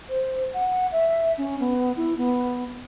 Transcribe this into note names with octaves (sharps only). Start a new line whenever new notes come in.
C5
F#5
E5
C#4
B3
E4
B3